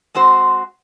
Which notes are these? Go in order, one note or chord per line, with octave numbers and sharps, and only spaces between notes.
G#3 C4 F#4 C5